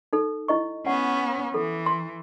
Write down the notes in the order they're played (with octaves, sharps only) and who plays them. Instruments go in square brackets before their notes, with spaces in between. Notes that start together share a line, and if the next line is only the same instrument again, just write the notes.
[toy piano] D#4 A4
E4 D#5 C#6
[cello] B3 C#4 [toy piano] F#5
[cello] E3 [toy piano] A4
[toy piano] C6